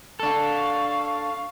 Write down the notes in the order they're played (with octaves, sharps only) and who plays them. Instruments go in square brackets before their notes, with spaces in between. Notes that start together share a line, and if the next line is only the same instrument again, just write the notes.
[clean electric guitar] D4 A4 [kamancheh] C#5 F5